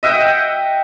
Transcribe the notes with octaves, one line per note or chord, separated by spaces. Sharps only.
D#5 E5 F#5 G5